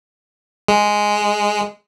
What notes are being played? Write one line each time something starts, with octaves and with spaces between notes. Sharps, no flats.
G#3